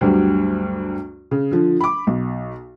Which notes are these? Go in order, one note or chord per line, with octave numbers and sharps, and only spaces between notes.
D2 G2 F#3 G3
C#3
D3 F3
B5 D6
B1